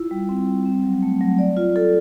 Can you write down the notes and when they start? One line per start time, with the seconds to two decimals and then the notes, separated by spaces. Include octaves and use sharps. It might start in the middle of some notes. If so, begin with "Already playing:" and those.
Already playing: E4 F4
0.11 G3
0.29 C4
0.47 G3
0.65 C4
0.84 F#3
1.03 A3
1.21 F#3
1.39 D5
1.57 F4
1.76 A4